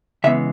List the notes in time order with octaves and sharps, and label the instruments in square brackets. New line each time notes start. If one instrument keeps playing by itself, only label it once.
[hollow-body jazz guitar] C#3 E3 G#3 B3 E5